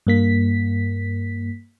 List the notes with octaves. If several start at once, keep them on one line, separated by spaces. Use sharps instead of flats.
G2 A#3 B6